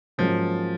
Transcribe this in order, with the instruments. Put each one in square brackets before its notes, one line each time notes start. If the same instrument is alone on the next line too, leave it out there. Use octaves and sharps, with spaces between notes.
[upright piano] G#2 F#3 A#3 C#4 [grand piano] F3